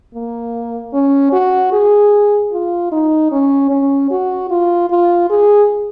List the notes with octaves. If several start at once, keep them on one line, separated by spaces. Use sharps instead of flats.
A#3
C#4
F#4
G#4
F4
D#4
C#4
C#4
F#4
F4
F4
G#4